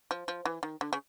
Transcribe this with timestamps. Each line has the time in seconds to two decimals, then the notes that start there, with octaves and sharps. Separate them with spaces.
0.11 F3
0.28 F3
0.45 E3
0.63 D#3
0.81 D3
0.93 C#3